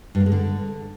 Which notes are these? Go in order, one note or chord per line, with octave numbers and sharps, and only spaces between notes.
G2
A#3
G#3
D3